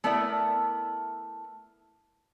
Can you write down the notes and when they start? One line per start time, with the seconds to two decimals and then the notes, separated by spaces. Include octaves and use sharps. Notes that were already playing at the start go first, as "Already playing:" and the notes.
0.04 A3 B3 E4 A#4 D5 E5